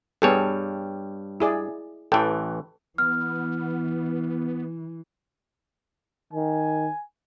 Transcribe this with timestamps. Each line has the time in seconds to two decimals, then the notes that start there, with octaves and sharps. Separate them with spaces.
0.22 G2 G3 B3 G#4 A4 C#5
1.40 E4 G#4 D5
2.12 A1 E3 A4 G5
2.98 E3 B3 F6
6.33 D#3 G#5